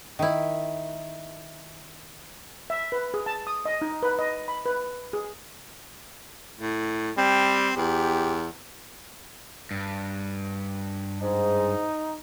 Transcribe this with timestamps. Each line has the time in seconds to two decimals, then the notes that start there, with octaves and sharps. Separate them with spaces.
0.19 D#3 E4
2.70 E5
2.92 B4
3.14 G#4
3.26 A5
3.47 D#6
3.65 D#5
3.82 D#4
4.03 B4
4.19 D#5
4.48 B5
4.66 B4
5.13 G#4
6.60 A2
7.17 G3 C4
7.77 E2 G4
9.71 G2
11.21 G#2 D#4